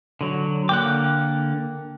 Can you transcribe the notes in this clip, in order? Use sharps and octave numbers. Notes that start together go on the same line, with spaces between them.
D3 F#3
D3 A#3 G5 D6 F#6